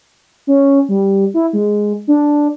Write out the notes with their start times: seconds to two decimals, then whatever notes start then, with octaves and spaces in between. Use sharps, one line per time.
0.47 C#4
0.89 G3
1.34 E4
1.53 G#3
2.08 D4